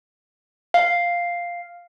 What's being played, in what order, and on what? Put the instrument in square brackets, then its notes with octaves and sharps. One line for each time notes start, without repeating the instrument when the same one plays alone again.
[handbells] F5